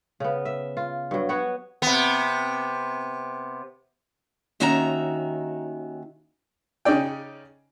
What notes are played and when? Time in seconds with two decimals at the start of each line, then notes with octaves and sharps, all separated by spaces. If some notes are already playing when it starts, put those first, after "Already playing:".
0.20 C#3 B3
0.45 E5
0.77 F4
1.11 G2 F#3
1.29 B3 F#4 C#5 F#5
1.82 C3 B3
4.60 D#2 D#3 C#4 F#4 E5 A#5
6.85 C#3 C#4 D#4 D5 G5